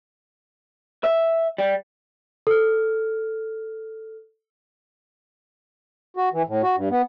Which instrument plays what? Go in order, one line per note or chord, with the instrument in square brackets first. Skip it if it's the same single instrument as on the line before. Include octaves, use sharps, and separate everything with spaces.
[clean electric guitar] E5
G3
[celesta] A4 F6
[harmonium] F#4
E3
A2
F#4
G2
B3